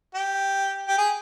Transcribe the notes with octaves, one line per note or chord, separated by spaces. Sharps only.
G4
G4
G#4